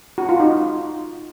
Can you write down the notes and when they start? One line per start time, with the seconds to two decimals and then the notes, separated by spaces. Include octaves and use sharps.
0.18 F#4
0.29 F4
0.40 D#4